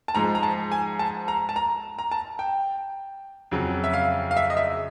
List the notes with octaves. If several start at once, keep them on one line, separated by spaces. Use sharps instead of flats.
A5
G#2 F3 G#3 A#5
A#5
A5
G#5
A5
A#5
A5
A#5
A#5
A5
G5
F2 C#3 F#3
E5
F5
F5
E5
D#5
E5